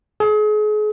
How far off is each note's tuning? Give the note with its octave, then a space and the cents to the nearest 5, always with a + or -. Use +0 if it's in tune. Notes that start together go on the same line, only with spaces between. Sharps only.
G#4 +35